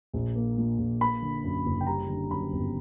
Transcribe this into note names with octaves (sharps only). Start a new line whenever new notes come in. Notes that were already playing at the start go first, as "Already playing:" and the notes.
A#1
A#3
A#2
A#1
A#3 B5
D3
F#2
F#1
G5
G3 A#5
D3
F#2 B5
G1